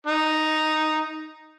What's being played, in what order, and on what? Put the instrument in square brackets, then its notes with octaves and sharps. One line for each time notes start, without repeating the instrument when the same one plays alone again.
[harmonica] D#4